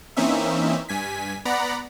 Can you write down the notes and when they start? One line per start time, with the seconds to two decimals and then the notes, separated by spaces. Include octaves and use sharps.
0.17 E3 A#3 C4 C#4 D#4 E5
0.89 G2 G#5 B6
1.45 B3 D5 F#5 A#5 B5